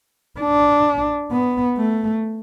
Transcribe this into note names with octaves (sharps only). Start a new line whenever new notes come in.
D4
B3
A3